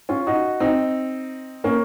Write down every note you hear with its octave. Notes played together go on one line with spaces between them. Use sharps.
C#4 F4
D#4 F#4
C4 D#4
A#3 C#4